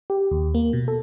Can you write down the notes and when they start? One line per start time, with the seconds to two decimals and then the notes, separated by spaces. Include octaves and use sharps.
0.10 G4
0.31 D#2
0.55 A#3
0.73 B2
0.88 A4